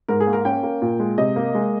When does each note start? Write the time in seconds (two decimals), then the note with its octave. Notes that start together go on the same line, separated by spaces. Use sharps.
0.08 G#2 A#4
0.20 G#4
0.27 A#3
0.33 A#4
0.45 C#4 G5
0.63 A#3
0.82 A#2
1.00 G#3
1.18 C3 D#5
1.36 A#3
1.55 G#3